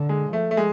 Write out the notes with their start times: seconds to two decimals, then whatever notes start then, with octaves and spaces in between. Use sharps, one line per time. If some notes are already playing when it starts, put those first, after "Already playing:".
Already playing: D3
0.09 G#3
0.33 F3 A3
0.51 A3
0.57 G#3